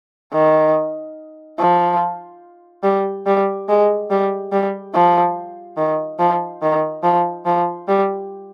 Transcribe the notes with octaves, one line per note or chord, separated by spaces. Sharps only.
D#3
F3
G3
G3
G#3
G3
G3
F3
D#3
F3
D#3
F3
F3
G3